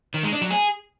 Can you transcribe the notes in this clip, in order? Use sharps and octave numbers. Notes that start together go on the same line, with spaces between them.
D#3
G#3
D4
F#3
G#4